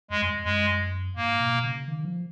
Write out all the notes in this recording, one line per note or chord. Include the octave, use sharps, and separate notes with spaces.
F2 G#3
F#2
F2
F#2 G#3
G#2 A#3
B2
B2
C#3
D#3
D#3
F3